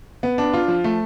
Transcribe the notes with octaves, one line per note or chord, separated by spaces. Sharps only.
B3
D4
F4
F3
A3